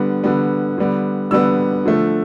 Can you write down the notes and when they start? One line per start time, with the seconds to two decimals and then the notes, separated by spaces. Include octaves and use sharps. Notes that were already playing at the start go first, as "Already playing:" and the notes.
Already playing: D3 G3 B3
0.24 D3 G3 B3
0.78 D3 G3 B3
1.31 D3 G3 B3 E6
1.85 D3 F3 A3